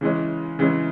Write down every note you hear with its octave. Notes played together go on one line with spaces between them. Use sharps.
C#3 E3 G#3 C#4
C#3 E3 G#3 C#4